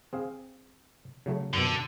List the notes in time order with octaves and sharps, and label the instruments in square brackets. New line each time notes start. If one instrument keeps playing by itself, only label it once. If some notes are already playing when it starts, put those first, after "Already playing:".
[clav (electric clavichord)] C4 G#4 F5
C#3 F#3 A3
[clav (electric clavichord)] F#2 B2 [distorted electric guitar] D3